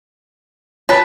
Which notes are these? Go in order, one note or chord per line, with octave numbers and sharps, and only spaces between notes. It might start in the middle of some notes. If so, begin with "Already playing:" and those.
F4 B4 C#5 A5 B5